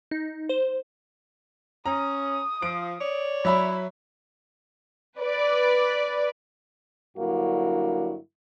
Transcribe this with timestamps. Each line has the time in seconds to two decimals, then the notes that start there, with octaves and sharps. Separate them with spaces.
0.11 D#4
0.49 C5
1.86 C#4 A#5 D#6
2.62 F3 D7
3.00 C#5 D5
3.45 F#3 E4 E5 B5
5.19 B4 D5
7.17 G2 D3 F#3 A#3 E4 F#4